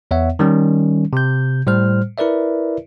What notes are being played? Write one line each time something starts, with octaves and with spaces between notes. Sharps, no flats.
E2 B3 C#5 E5 F#5
D#3 G3 C#4
C3 G6
A2 G3 C5 F6
E4 A#4 B4 D5 E5